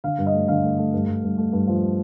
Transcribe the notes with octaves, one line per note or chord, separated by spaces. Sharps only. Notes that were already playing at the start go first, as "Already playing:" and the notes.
D3 F5
G2
D#5
A3
D3 F5
A3
A3
G2
G2
G2
A3
G2
F3